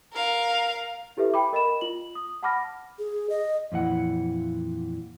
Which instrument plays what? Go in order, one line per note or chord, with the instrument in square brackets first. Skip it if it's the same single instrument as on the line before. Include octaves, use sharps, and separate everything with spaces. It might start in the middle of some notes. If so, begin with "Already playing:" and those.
[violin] A#4 F5
[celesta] E4 G4 A4 B4 E5
G5 B5 D6
A#4 D#5 B5 E7
F4 F#7
D#6
F#5 A5 B5 D6 F6 A#6
[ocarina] G#4
D#5
[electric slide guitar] F2 A#2 E3 F#5